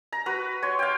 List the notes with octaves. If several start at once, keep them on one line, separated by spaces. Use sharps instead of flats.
A#5
F#4 B4
C#5 C6
F5 G5